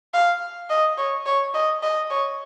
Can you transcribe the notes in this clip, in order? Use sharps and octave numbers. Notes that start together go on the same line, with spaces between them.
F5
D#5
C#5
C#5
D#5
D#5
C#5